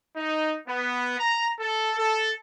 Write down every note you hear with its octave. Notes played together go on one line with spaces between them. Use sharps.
D#4
B3
A#5
A4
A4